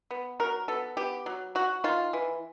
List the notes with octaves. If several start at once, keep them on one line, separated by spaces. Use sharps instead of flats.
B3
F#3 A#4
B3 A4
B3 G4
F#3
F#3 F#4
D#3 F4
E3